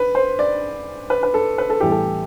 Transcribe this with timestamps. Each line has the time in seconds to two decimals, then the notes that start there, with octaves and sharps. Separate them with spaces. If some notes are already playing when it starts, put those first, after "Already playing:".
Already playing: B4
0.15 C5
0.39 D5
1.10 B4
1.23 B4
1.34 A4
1.58 B4
1.70 A4
1.80 A2 E3 G3 B3 G4
1.91 A4